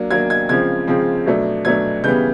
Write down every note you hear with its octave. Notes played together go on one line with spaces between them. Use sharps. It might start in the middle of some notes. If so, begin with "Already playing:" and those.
Already playing: F#3 A#3 D4
F#3 A#3 D4 G#6
G#6
C#3 F3 G#3 C4 G#6
C#3 F3 G#3 C4
B2 F#3 A3 D4
B2 F#3 A3 D4 G#6
C#3 E3 G3 B3 G6